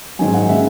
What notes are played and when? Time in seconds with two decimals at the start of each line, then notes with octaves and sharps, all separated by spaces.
0.19 G#2 D#3 F#3 G#5
0.34 F#5
0.49 C#3 G#3 E5